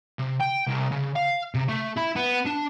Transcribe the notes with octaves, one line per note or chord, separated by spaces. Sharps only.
C3
G5
C2
C#3
F5
C3
A3
E4
B3
D4